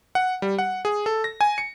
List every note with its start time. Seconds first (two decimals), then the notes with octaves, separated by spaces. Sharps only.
0.15 F#5
0.42 G3
0.59 F#5
0.85 G#4
1.06 A4
1.24 A#6
1.41 G#5
1.58 C#7